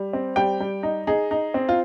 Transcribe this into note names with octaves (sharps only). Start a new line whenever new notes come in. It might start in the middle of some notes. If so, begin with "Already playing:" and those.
Already playing: G3
C4
G3 G5
G3
D#4
D#4 G#4
D#4
C4
F4